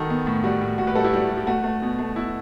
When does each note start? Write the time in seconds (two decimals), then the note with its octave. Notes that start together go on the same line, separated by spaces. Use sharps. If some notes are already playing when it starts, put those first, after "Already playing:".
Already playing: D#3 F#4 A4
0.10 B3
0.27 A2
0.44 G3 F#4
0.62 A2
0.78 A2 F#4
0.87 G4 B4
0.95 G3 F#4 A4
1.04 E4 G4
1.13 G3 F#4
1.30 G3
1.38 G4
1.47 A3 F#4
1.64 A3
1.82 B2
1.99 A3
2.16 B2 E4